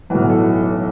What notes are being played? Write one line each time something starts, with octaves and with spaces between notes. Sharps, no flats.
B1 A2 E3 F#4
A4